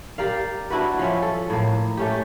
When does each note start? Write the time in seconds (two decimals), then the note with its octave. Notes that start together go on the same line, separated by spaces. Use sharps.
0.18 G4 A#4 D5 F5
0.70 D4 E4 F#4 B4
0.99 F3 C#4 E5
1.22 A4
1.50 A2 A#3
1.97 A3 C#4 G4